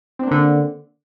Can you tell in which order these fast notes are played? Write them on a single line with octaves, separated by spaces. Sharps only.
C4 D4 A#3 D3